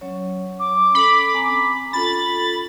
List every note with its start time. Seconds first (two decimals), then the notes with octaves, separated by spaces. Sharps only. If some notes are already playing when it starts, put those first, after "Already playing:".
0.01 F#3 C#4 C#5
0.60 D6
0.95 C#4 A4 B5
1.34 C4 G#5 A#5
1.93 C#4 F4 A4 B5 A6